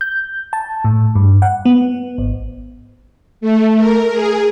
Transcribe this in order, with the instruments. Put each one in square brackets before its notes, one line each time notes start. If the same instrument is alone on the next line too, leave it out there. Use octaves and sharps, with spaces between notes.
[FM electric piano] G6
A5
A2
G2
F#5
B3
G#1
[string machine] A3
A#4
G#4